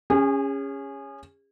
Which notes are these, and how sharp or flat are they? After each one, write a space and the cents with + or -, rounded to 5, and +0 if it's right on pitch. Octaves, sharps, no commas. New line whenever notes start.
C#4 +0 G#4 -35